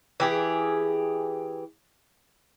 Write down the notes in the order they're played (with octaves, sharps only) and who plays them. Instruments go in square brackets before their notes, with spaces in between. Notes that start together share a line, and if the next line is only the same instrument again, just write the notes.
[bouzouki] E3 G4 G#4